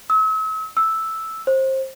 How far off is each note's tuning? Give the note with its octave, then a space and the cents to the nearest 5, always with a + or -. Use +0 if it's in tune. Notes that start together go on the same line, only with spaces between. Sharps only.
E6 -40
E6 -5
C5 +25